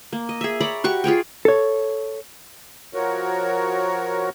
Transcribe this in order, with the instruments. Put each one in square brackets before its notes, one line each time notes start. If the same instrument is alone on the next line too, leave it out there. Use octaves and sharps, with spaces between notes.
[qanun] A#3
D#5
G#4 E5
C#5 D5 A#5 B5
F#4 G4 C#6
F4 G#4 C#5 G5
[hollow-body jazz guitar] A4 C#5
[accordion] F3 F#4 A#4 C#5